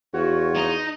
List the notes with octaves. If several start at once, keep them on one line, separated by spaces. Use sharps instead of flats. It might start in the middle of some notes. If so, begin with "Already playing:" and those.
E2 F4 F#4 C#5
D#4